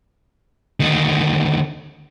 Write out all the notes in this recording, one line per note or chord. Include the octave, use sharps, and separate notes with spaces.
D2 D#3